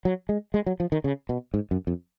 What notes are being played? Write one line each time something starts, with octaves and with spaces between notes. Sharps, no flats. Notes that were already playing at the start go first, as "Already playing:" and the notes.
F#3
G#3
G#3
F#3
F3
D#3
C#3
B2
G#2
F#2
F2